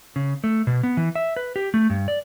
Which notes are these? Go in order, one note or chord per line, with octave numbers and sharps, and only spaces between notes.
C#3
A3
B2
B3
E3
E5
B4
G4
A3
G2
D5